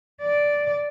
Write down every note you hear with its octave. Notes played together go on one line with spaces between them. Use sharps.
D5